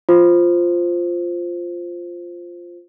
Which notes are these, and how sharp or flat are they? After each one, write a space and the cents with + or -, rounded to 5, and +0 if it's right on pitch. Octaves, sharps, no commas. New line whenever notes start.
F4 +0 C5 +0